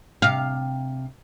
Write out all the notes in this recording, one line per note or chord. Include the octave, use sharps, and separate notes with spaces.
C3 F5